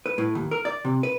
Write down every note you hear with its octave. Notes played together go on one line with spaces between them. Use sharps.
B4
A2
D#2
A#4
D5
C3
B4